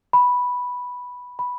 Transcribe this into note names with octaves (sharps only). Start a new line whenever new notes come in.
B5
B5